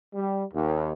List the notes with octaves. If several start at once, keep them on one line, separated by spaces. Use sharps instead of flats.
G3
D#2